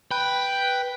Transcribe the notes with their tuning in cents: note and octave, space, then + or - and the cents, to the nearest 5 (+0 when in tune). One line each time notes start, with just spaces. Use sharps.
B4 +0 G5 +0